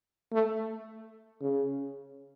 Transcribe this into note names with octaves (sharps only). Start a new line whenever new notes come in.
A3
C#3